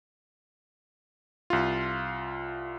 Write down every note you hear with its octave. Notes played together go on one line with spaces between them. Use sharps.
C2 F4